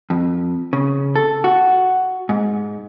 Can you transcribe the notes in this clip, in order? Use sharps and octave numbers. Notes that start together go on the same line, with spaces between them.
F2
C#3
A4
F#4
G#2